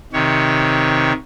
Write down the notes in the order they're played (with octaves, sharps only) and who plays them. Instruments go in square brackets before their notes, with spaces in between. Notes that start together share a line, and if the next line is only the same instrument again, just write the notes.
[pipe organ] C3 D#3 C#5